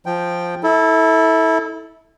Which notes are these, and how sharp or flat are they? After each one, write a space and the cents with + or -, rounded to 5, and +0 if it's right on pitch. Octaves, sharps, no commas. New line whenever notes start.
F3 +0 G5 +0
E4 -25 A4 +0